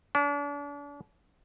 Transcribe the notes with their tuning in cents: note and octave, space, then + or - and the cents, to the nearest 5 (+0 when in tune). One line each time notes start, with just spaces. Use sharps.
D4 -40